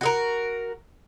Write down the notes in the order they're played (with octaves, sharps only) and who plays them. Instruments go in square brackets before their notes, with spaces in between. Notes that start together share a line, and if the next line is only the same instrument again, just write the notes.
[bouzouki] F#4 G#4 A#4